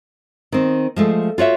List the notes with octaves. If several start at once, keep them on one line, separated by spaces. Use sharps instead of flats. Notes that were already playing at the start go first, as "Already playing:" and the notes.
D#3 C4
F3 G#3 A3
F4 F#4 C#5 E5